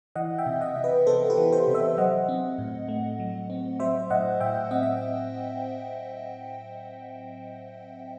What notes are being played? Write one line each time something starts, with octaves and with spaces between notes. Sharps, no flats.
E3 D#5 F#5
E5 G5
C3
D#5 F#5
C3
B4 D#5
B3 A4 C5
G4 B4
E3
A4 C5
C3
C5 E5
F#3 D#5 F#5
C4
A2
A3
F#3
C4
F#3 C5 E5
A2 D#5 F#5
A2 E5 G5
C4 D#5 F#5
E5